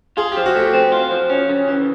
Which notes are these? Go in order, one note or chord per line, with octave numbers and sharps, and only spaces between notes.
F4 G#4
F3 G4
F#4
A3 G4
C4
F4
F3
C#4
C#3
E3